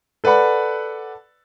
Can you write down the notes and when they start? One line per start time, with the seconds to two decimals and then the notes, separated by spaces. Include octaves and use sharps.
0.24 A4 B4 D5 F#5 B5